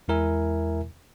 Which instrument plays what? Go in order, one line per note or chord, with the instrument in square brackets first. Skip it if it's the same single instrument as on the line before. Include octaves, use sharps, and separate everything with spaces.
[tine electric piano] E2 G#3 E4 A#4 E5 G#5